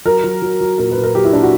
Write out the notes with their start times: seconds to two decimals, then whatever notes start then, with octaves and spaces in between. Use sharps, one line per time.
0.05 F#3 A#4
0.24 F#3
0.42 F#3
0.60 F#3
0.78 A#2 A#4
0.91 B4
0.97 A#2
1.03 A#4
1.15 F#3 G4
1.24 E4
1.33 A#2 D4
1.43 F#4